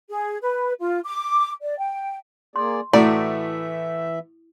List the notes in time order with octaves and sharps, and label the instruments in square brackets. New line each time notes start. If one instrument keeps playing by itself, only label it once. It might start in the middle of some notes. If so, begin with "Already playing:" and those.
[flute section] G#4
B4
F4
D6
D5
G5
[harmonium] A#3 G#4 D5 [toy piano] C6
[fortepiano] A2 A3 F#4 [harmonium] E3 E5 [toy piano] E4 [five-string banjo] D5